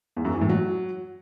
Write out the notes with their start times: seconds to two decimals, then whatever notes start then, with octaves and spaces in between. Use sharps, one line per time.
0.16 E2
0.25 F#2
0.33 E3
0.41 A2
0.49 F#3